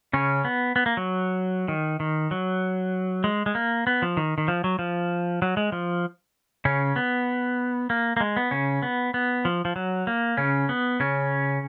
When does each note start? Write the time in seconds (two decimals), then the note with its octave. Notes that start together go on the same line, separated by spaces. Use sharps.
0.13 C#3 C#4
0.45 B3
0.76 B3
0.86 A#3
0.97 F#3
1.68 D#3
2.00 D#3
2.31 F#3
3.24 G#3
3.46 G#3
3.55 A#3
3.87 B3
4.02 F3
4.17 D#3
4.38 D#3
4.48 F3
4.64 F#3
4.79 F3
5.42 F#3
5.57 G#3
5.72 F3
6.65 C#3 C#4
6.96 B3
7.90 A#3
8.17 A#3
8.21 G#3
8.37 B3
8.51 C#3 C#4
8.83 B3
9.14 B3
9.45 F3
9.65 F3
9.76 F#3
10.07 A#3
10.37 C#3 C#4
10.69 B3
11.00 C#3 C#4